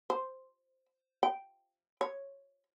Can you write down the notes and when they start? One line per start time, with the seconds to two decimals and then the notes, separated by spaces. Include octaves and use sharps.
0.10 C5
1.23 G5
2.01 C#5